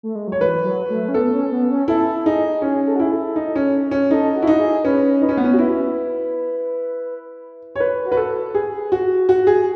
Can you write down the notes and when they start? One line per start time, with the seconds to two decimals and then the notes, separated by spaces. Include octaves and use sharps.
0.03 A3
0.15 G#3
0.28 F#3 C#5
0.40 E3 B4
0.65 F#3
0.90 A3
1.08 C#4
1.14 B3 A4
1.33 C#4
1.51 B3
1.71 C#4
1.88 E4 A4
2.25 D#4 G#4
2.62 C#4 G#4
2.87 A4
2.96 F#4
2.99 E4 G#4
3.11 A4
3.36 D#4
3.56 C#4
3.91 C#4
4.11 D#4 A4
4.36 F#4
4.42 E4
4.47 D#4
4.59 G#4
4.84 C#4 B4
5.22 D#4 B4
5.29 C#4
5.37 B3
5.44 C#4
5.54 F#4
5.59 E4 B4
7.76 C#5
7.80 B4
8.05 F#4
8.12 B4
8.17 A4
8.54 G#4
8.92 F#4
9.29 F#4
9.47 G#4